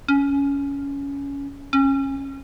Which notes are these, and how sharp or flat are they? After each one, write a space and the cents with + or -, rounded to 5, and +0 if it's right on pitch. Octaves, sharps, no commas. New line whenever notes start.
C#4 +15
C#4 -25